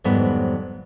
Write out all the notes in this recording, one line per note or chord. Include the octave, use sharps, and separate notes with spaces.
F2 G#2 D#3 F#3 G3 B3